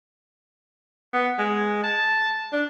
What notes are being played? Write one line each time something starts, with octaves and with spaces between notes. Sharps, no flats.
B3
G#3
A5
D4